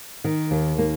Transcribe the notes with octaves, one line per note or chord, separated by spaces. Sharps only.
D#3
D#2
A#3